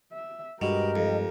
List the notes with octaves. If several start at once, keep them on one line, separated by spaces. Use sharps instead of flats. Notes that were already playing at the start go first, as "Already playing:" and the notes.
E5
G2 B2 G#3 G4 A#4 D#5
F2